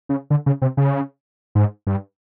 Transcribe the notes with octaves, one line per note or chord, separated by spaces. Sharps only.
C#3
D3
C#3
C3
C#3
G#2
G2